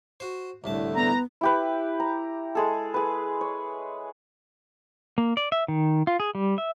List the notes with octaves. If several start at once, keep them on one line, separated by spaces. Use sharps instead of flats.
F#4 C5
C2 A2 D3 A3 A5
B3 A#5
E4 G4 B4
A#5
G#3 G#4 A4
G#4 B4
C#5
A#3
D5
E5
D#3
F4
G#4
G3
E5